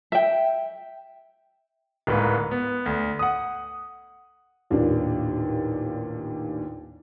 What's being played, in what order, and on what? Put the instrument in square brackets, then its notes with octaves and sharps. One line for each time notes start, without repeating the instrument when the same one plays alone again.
[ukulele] E5 G5
[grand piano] D1 G#2 A#3 B4
B3
D2
F#5 D#6
[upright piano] A1 D#2 A#2 A#3 D4